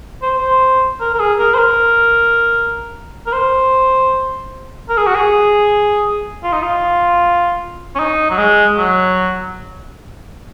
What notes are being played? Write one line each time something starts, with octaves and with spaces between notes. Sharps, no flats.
C5
C5
A#4
A#4
G#4
A#4
C5
A#4
A#4
C5
A#4
G#4
F#4
G#4
F4
D#4
F4
C#4
D#4
F#3
G#3
F#3